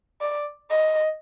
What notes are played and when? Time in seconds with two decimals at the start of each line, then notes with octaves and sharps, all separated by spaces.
0.21 D5
0.70 D#5